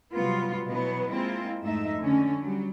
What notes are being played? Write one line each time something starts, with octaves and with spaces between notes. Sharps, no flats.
C3 F#3 G3 B3 F4
B2 E3 F#3 B3
G#3 A#3 C4 E4 F4
F2 G#2 A3 D#4 E5
D3 G#3 C#4
F#3 G3